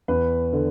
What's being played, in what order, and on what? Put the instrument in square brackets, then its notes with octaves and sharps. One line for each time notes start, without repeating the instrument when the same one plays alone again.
[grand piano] E2 B4
D3